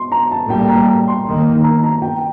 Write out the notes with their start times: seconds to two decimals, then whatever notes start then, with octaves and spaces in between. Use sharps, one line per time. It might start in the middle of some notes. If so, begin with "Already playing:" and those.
Already playing: C6
0.12 A#5
0.31 A5
0.50 A2 G3 A#3 G5
0.69 A#5
0.88 A#5
1.08 C6
1.26 D#3 A#3
1.64 A#5
1.84 A#5
2.02 G5